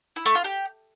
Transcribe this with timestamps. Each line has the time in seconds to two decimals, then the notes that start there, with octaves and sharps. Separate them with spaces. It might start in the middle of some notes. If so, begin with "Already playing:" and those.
0.16 E4
0.26 A3
0.35 F4
0.44 G4